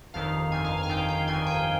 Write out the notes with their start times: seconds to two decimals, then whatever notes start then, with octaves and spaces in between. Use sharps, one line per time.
0.14 G1 F2 D#3 F5
0.51 G1 F2 D#3 G#5
0.65 F5
0.77 G#5
0.83 F5
0.89 G1 F2 D#3 G5
1.08 G5
1.28 G1 F2 D#3 G#5
1.46 G5